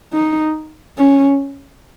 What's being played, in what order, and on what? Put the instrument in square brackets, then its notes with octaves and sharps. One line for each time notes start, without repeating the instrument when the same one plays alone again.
[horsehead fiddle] D#4
C#4